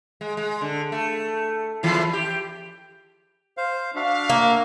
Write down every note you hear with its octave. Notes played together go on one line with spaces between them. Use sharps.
G#3
G#3
D3
A3
E2 E3 E4
G4
C5 F5
D4 F#4 E5 F5
A#3